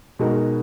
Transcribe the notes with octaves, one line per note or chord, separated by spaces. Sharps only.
B2 G#3 D#4 F#4 A#4